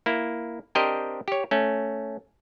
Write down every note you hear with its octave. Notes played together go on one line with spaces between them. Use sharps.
A#3 E4
C4 D4 G4 A#4 C5 D#5
G4 C#5
A3 C#4